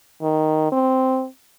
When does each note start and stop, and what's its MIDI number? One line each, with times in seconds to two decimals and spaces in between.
0.22 0.69 51
0.72 1.26 60